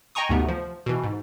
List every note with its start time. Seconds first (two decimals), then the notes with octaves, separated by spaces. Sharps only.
0.15 D#5 G5 G#5 A#5 C#6 D#6
0.29 D2 G#2 C3 A3 B3
0.48 F3
0.86 B2 E3
1.04 G#2